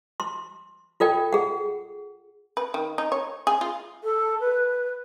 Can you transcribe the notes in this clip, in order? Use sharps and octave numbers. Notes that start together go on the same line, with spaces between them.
C6
F4 A4 D5 G5
G#4 F#5
B4
D#3
D#4
C#5
G#4
F4
A4
B4